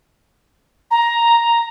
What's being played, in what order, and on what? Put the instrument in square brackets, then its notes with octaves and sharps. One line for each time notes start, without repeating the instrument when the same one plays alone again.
[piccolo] A#5